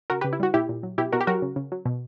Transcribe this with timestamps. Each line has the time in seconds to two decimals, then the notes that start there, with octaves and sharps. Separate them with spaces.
0.10 C#3 F#4 A#4
0.21 C#3 G4 B4
0.33 E4
0.40 G3 F#4
0.54 A#2 E4 G4
0.69 A#2
0.83 F#3
0.98 B2 E4 G4
1.12 B2 F#4 A#4
1.21 G4
1.27 F#3 F#4 A#4
1.42 C#3
1.56 C#3
1.72 F#3
1.85 B2